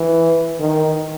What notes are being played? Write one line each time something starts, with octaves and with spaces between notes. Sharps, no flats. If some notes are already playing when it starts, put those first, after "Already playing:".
Already playing: E3
D#3